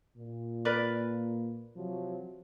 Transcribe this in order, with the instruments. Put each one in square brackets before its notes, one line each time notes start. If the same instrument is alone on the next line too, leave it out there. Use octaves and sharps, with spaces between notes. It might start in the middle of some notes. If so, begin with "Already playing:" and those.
[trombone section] A#2
[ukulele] A#4 B4 D5
[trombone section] C3 F3 F#3